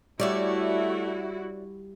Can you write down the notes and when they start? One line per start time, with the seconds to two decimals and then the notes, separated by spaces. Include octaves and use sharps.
0.20 G3 A3 E4 F#4 C#5 D5 E5